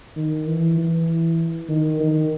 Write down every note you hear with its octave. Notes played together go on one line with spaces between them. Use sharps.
D#3
E3
E3
D#3
D#3